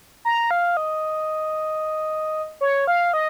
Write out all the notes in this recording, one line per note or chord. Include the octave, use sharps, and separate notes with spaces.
A#5
F5
D#5
C#5
F5
D#5